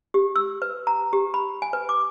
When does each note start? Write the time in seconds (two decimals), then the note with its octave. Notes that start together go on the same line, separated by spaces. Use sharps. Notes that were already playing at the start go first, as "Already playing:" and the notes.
0.14 G4
0.36 E6
0.62 B4
0.87 A#5
1.13 G4
1.34 B5
1.62 G#5
1.73 B4
1.89 D6